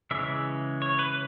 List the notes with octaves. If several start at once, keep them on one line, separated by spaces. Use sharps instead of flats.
C#3 E3 G#3 C#4 E5
C#5
B4